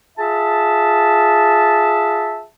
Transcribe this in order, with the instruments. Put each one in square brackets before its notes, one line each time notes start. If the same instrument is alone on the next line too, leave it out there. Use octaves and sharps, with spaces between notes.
[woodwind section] F4 G#4 E5 A5